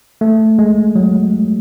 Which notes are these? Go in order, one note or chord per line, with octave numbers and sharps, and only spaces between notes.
A3
G#3
F#3